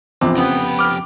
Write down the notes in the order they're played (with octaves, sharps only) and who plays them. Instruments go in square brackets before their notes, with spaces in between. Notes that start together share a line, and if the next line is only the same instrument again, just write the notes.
[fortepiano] A#1 E2 D6 [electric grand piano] C4
[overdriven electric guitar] F2 G4 [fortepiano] C#3 [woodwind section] B3
[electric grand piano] D6 F6